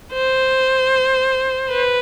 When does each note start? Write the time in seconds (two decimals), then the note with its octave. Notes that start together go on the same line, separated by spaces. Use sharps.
0.13 C5
1.71 B4